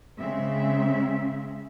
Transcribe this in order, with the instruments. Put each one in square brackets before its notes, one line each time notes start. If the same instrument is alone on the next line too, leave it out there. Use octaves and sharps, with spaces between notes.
[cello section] C#3 G#3 C4 E5